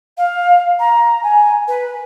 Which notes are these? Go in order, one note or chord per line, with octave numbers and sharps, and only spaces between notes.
F5
A#5
G#5
B4